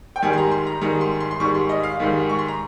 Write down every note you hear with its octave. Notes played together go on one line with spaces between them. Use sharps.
G5
G#2 D#3 G3 G#5
C6
A#5
C6
A#5
G#2 D#3 G3 A#5
C6
C6
C6
G#2 D#3 G3 C#6
C6
D#5
F5
G#2 D#3 G3
C#6
C6
A#5